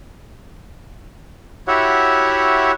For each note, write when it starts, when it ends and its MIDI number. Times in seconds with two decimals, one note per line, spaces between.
1.68 2.72 64
1.68 2.72 66
1.68 2.72 67
1.68 2.72 73
1.68 2.72 76
1.68 2.72 78